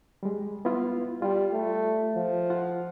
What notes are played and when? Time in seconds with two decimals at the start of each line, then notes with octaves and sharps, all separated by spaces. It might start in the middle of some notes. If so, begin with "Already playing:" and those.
0.23 G3 G#3
0.65 B3 E4 F4
1.22 G3 F4
1.53 A3
2.16 F3
2.50 F4 F#5